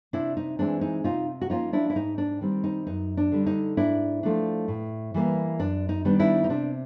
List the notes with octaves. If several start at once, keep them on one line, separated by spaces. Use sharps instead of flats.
C3 D4 E4
D#4
E3 G#3 C4 D4
D#4
C3 D#4 F4
F#4
F3 A#3 C#4 D#4 F4
D4 E4
E4
G#2 D#4
D4
D#3 G3 C4
D#4
F#2 D#4
D4
D3 G3
D#4
G#2 D4 E4
F3 A3 D4
A2
E3 G3 A#3
F#2 D4
D#4
D#3 G3 B3 D4
D4 E4
D#4
C3 D4